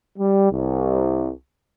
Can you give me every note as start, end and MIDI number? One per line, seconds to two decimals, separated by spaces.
0.18 0.50 55
0.52 1.31 36